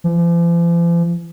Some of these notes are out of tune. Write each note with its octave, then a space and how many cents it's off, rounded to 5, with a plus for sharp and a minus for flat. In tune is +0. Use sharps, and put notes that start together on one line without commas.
F3 -45